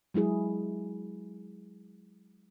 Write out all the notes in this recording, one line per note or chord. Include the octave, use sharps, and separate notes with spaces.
F#3 G#3 E4 G#4